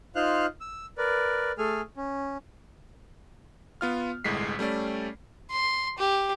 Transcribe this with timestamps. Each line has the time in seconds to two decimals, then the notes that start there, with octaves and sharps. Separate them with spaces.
0.16 D#4 F4 C5 F5 F6 F#6
0.61 E6
0.98 A#4 B4 D5
1.58 A3 G#4 A4 G#5 F6
1.97 C#4
3.81 B3 F4 F6
4.24 G1 C2 A2 G#3 B6 C7
4.59 G3 A3 C#4 D5
5.50 C6
5.98 G4